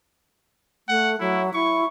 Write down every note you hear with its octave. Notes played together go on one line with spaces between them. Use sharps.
A3 F#5
F#3 E4
E4 C#6